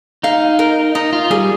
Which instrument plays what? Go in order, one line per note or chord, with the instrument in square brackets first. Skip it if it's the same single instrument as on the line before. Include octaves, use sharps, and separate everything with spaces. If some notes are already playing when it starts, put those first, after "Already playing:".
[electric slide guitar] D#4 [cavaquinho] F5
[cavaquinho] A#4
[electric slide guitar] D#4 [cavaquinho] D#5
[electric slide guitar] F4
[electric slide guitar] G3 [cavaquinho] G#4